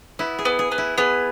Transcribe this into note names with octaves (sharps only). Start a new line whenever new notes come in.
B3 E4
G#4
B3
G#4
B3
E4
B3 G#4